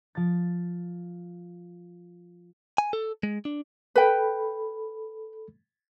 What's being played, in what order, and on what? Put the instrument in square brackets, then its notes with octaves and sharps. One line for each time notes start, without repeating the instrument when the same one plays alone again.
[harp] F3 A6
[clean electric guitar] G#5
A4
G#3
D4
[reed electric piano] A4 B5 [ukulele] B4 G5